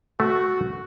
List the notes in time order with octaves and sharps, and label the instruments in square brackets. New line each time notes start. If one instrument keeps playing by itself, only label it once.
[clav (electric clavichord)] A3 [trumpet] F#4